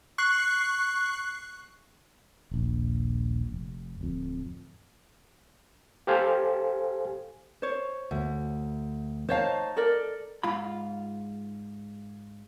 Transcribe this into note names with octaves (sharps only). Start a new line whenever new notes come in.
C#6 F#6 C7
D#1 A#1
F1
D1 F2
G4 A4 C5 F5 G#5
C5 C#5
D2
D#4 C5 C#5 F5 A5
A4 A#4 D5
G#2 F4 B5